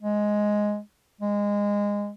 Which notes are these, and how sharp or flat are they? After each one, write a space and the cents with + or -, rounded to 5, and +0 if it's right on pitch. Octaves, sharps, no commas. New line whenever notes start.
G#3 +5
G#3 -20